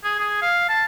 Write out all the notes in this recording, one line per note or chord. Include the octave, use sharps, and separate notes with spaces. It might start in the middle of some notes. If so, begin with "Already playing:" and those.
G#4
G#4
F5
A5